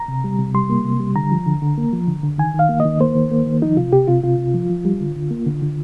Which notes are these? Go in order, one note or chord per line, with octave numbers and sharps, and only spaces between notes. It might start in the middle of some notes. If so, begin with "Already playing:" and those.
Already playing: A#5
C3
G3
C3
G3 C6
A#3
C3
G3
D3 A#5
F3
D3
D3
A#3
F3
D3
D3
D#3 G#5
D#3 F5
A#3
D#5
D#3
A#3 C5
D#3
A#3
D#3
F3 D#4
C3 F4
C3 G4
C3 F4
C3 F4
C3
F3
F3
G3
D3
D3
A#3
D3
D3